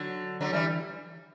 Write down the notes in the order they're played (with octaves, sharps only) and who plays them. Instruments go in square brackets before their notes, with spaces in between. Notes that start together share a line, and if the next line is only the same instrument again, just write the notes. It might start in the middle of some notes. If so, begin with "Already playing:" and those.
Already playing: [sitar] D3 F#3
D3 F#3
E3 G3